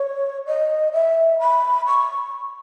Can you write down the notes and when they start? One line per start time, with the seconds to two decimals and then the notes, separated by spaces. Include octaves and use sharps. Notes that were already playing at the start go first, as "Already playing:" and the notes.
Already playing: C#5
0.47 D#5
0.93 E5
1.39 B5
1.86 C#6